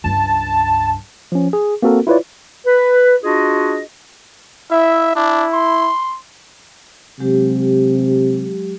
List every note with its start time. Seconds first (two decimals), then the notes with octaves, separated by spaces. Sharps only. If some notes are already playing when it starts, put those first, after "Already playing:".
0.04 C#2 G2 A5
1.32 F3 C#4
1.53 G#4
1.82 A#3 C4 F#4 A4 A#4
2.07 E4 F4 B4 C#5 D5
2.65 B4
3.23 D4 F4 F#4 G#4 D#5
4.71 E4 E5
5.16 D4 E4
5.53 C6
7.20 C3 F#3 G#3 G4